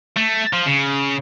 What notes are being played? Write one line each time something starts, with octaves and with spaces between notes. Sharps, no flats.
A3
F3
C#3